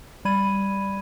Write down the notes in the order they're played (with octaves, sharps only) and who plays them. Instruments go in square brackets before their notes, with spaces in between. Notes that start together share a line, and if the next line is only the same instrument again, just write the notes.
[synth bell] G3 D5 B5 G#6 D#7